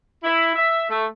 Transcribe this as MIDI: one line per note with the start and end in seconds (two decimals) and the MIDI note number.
0.23 0.52 64
0.55 0.85 76
0.90 1.05 57